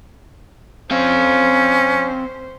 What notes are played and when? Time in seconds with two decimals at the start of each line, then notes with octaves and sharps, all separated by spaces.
0.91 C4 C#4 C5 F5